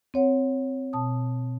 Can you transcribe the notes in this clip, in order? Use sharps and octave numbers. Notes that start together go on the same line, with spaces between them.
C4 C#5 F#5
B2 A5 D#6